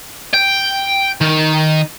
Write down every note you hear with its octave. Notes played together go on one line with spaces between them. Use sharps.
G5
D#3